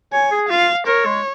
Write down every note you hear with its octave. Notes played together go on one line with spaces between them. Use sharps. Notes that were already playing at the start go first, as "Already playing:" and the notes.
C#5 G#5
G#4
F4 F5
A#4 C#5
G#3